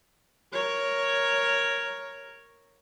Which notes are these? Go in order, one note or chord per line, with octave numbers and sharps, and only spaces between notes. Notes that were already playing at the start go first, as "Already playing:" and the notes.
A#4 C#5